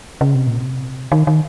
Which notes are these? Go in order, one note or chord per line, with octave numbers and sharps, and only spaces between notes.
C#3
C3
A#2
C3
D#3
D#3